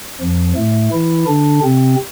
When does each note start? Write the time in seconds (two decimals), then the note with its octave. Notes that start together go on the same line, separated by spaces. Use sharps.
0.21 F2 F3
0.57 A2 A3
0.93 E3 E4
1.27 D3 D4
1.64 C3 C4